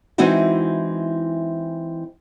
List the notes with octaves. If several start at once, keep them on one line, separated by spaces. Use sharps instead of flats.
E3 G#3 C4 D#4 E4 F#4